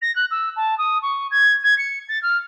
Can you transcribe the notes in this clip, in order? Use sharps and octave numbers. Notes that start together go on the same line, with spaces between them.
A#6
F#6
E6
A5
D#6
C#6
G#6
G#6
C#7
A6
F6